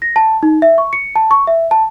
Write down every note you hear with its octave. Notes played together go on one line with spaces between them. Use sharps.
A#6
A5
D#4
E5
C#6
C#7
A5
C#6
E5
A5